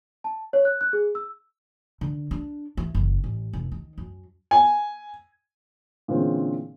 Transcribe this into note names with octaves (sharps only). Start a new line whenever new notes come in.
A5
C#5
F#6
F#6
G#4
E6
D3
D4
E3
F#1
A1
F1
D#3
F#2
G#5
A#2 D3 E3 G#3 C4 C#4